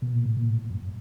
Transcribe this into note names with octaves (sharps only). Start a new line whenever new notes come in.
B2
A#2
A2
A#2
A2
F#2